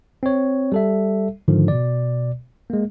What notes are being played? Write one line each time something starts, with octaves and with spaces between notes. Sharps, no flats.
C4 C#5
G3 A4 E5
G#2 D3 D#3 F3
B2 D5
G#3 A#3